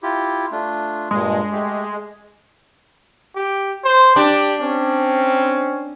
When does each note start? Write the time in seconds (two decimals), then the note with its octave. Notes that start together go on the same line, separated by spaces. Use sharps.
0.03 E4 F4 G4
0.52 A3 D4 F4
1.11 G2 A#2 G#3
1.52 A3 G4
3.36 G4
3.84 C5
4.16 D4 G4
4.61 C4 C#4